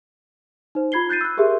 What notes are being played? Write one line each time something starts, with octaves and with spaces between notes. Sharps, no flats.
D#4 C5
F4 B5 G#6 C7 G7
F#6 G6 A6 C7 D#7
E6 F#6
G4 G#4 A#4 E5 C6